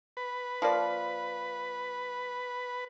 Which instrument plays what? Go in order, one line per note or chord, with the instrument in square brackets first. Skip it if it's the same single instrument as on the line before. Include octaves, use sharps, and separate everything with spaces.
[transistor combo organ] B4
[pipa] F3 A#3 D5